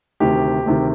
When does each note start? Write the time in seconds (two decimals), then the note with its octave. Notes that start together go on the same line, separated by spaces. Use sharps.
0.20 D2 C3 D#3 G4
0.66 D2 C3 D#3